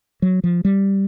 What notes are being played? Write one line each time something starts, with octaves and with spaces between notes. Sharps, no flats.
F#3
F3
G3